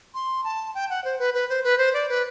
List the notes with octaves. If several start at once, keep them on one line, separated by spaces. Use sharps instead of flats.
C6
A5
G5
F#5
C5
B4
B4
C5
B4
C5
D5
B4